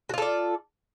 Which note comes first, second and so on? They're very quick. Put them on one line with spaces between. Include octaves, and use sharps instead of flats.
F#4 F4 A4 D5